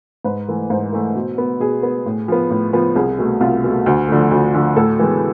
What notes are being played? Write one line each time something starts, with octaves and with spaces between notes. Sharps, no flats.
G#2 B4
E3 A3
G#2 C5
E3 A3
B2
B3
B2 G#4
B3
A2
F3 B3
A2
F3 B3
C2 G#4
B2 A3
C2 F4
B2 A3
D2
D3 F3 A3
D2
D3 F3 A3
A2 A4
E3 G#3 B3